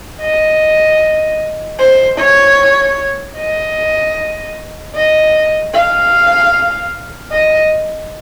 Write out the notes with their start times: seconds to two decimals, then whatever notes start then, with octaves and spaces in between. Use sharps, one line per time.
0.21 D#5
1.79 C5
2.19 C#5
3.38 D#5
4.95 D#5
5.74 F5
7.32 D#5